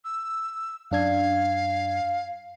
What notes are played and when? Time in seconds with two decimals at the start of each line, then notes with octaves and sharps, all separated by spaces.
0.05 E6
0.91 F#2 D4 F5 G#6